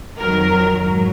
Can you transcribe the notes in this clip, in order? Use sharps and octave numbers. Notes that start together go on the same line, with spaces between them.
F2 D#3 F#3 A#4
G#2 F#3